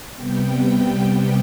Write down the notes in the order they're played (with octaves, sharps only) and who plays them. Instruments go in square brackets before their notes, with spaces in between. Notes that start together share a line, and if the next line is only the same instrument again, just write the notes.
[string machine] C3 G3 B3 G5